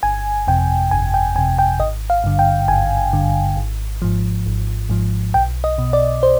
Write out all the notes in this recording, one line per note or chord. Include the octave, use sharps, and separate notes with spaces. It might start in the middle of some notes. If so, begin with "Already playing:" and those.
G1 G#5
F2 C3 G5
G1 G#5
G5
F2 C3 G#5
G5
G#1 D#5
F5
G2 D3
G5
G#1 G#5
G2 D3
G#1
G#2 F3
G#1
G#2 F3
B1 G5
D#5
B2
D5
C5